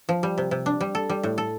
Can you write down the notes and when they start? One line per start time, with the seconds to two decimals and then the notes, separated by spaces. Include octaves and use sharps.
0.09 F3
0.23 G3
0.38 C3
0.51 C3
0.66 D4
0.81 G3
0.95 A4
1.09 G3
1.23 A2
1.38 A4